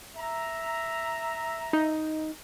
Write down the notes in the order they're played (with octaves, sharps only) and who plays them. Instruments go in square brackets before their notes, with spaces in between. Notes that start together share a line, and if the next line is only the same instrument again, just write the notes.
[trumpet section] E5 A#5
[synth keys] D#4